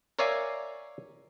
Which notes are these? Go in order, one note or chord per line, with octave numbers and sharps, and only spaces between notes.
A#4 C#5 D5 E5 F5 G#5